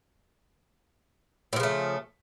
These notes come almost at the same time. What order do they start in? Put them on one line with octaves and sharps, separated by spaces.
A2 F3 C#3 A3